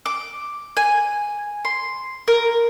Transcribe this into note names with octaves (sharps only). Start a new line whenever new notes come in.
D6
G#5
C6
A#4